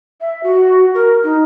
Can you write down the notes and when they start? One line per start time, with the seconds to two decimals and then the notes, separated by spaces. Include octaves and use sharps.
0.21 E5
0.43 F#4
0.95 A#4
1.24 D#4